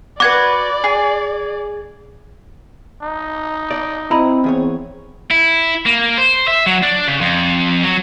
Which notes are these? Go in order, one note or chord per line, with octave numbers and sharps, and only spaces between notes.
F#4 B4 D5 D6 G#6
G#4
D#4
D5
C4 E4 D#5 A#5 B5
E2 G#4 C#5
E4
A#3
C5
E5
F#3
D4
C#3
F2
F#3